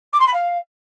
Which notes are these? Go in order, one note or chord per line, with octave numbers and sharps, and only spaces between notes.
D6
C6
B5
F5